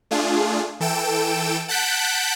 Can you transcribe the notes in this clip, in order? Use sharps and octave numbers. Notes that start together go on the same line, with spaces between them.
A3 D4 F4 G#4
E3 A4 G5 D7 E7
F#5 A5 F#6 G6 B6 D7